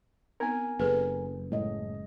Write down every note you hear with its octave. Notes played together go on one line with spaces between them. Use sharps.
B3 C4 D#4 A#4 G#5
F#1 G#4 A4 B4
A2 G#3 D#5